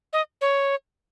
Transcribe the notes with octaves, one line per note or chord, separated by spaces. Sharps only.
D#5
C#5